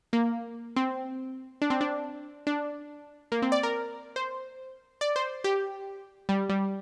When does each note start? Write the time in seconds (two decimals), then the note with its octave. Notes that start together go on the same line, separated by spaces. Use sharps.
0.13 A#3
0.76 C4
1.62 D4
1.70 C4
1.81 D4
2.47 D4
3.32 A#3
3.42 C4
3.52 D5
3.63 A#4
4.16 C5
5.01 D5
5.16 C5
5.44 G4
6.29 G3
6.49 G3